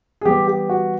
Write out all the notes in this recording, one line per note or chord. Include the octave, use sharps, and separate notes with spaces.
G#4
E3 G3 B3 G4
G4
F#4